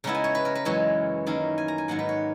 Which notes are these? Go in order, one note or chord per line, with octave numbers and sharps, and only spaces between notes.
C#3 G#3 B3 E4 A#5
G#5
C#5
B4
A#4
B4
F#2 E3 G#3 C#4 C#5
D#3 A#3 C#4 E4
G#5
A#5
G#5
G#2 D#3 F#3 A#3 F#5
B4
C#5